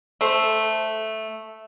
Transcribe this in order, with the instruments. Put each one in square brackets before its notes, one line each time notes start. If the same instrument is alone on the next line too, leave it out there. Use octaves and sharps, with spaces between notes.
[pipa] A3 C5